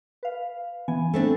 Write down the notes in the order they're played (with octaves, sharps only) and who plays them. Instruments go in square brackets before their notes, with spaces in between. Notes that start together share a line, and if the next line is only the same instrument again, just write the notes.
[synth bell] B4 F5
E3 B3 G#5
[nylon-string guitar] A3 C4 D4